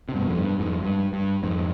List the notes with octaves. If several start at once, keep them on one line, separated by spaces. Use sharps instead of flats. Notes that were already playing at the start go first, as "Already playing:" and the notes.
C3
G2 B2
F2
G2
F2 G#2
G2
G2
F2 G#2